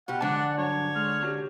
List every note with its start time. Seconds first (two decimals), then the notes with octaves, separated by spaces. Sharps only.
0.08 B2 F4 G4 F#5
0.21 G#2 D3 F3 G#3 D4 A5
0.41 D5
0.57 G2 F#3 D4 C#5
0.95 G#3 F6
1.23 D4 F#4 G4